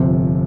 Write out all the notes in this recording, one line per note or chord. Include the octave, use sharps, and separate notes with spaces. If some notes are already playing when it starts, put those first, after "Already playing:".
Already playing: G1 F2 C3